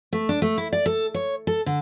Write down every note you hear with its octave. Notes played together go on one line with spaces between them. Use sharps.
A3
D4
A3
E4
D5
A4
C#5
A4
D3